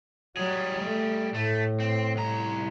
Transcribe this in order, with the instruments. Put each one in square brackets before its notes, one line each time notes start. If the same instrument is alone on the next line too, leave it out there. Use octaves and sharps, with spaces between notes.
[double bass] F#3 [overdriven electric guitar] G3 G#4
[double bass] A3
[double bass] A2 [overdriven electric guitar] A3
[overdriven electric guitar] C4
C2 A#5